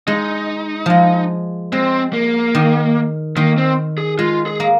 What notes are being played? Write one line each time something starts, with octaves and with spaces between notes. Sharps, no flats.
G#3 D#4
F3 G#3
G#3 C4
A#3
D#3
D#3 A#3
C4
G#4
G#3 F4
G#4
A#3